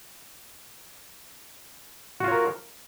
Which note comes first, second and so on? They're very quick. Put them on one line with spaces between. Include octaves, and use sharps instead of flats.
F#4 F4 C#5 A#4